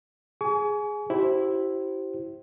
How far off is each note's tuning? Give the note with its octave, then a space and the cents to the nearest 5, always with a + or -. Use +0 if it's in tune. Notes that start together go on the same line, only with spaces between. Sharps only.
G#4 +0 G#5 +20 C#6 +45
E4 +0 G4 -35 C5 +5